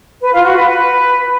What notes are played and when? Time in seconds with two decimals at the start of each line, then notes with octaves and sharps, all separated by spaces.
0.21 B4
0.33 F4
0.44 F#4
0.56 B4
0.68 B4